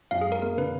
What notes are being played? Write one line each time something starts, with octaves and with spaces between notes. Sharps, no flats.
F#2 F5
G#4
G#3
A#4
A#3 A#4
D3 B4